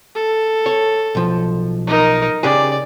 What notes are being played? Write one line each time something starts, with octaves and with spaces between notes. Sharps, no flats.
A4
C#5
B1 F3
D#4 A#4
C#3 G4 G#4 D5